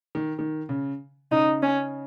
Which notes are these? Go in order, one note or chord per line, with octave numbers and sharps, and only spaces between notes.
D#3
D#3
C#3
C#3 D#4
C#4